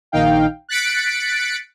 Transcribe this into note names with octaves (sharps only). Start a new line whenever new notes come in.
A#1 D#3 D#4 F5 G5
F#6 A6 B6 C#7 D7